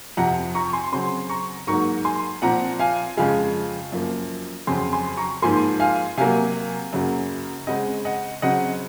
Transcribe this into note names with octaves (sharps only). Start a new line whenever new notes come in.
F2 C3 F3 F#5 A#5
A#5 C#6
G#5 C6
C#3 F#3 C4 G#5 C6
A#5 C#6
G#2 F#3 A#3 A#5 C#6
G#5 C6
A#2 F3 C4 F#5 A#5
F5 G#5
F2 C#3 F3 G#3 F5 G#5
F#2 F3 A#3
F2 C#3 F#3 C4 G#5 C6
G#5 C6
A#5 C#6
G#2 F3 A#3 G#5 C6
F5 G#5
C3 F#3 A#3 F5 G#5
F#2 C#3 F#3 A#3
C#3 G#3 C4 D#5 F#5
D#5 F#5
C#3 F#3 C4 D#5 F#5